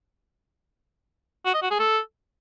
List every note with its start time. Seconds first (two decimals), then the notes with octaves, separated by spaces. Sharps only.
1.46 F#4
1.54 D#5
1.62 F#4
1.71 G#4
1.79 A4